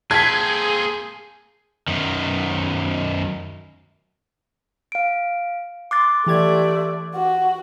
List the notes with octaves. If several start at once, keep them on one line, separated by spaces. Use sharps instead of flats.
A#3 C4 G#4 A5 G#6 B6
F#2 D#3
F5 D7
C6 D6 F#6 A6
E3 A3 G4 D5 G#6
F#4